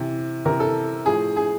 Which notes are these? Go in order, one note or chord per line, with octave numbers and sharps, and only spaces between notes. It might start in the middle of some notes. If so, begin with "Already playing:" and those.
Already playing: C3 E3
C3 E3 A#4
A4
A2 F3 G#4
G#4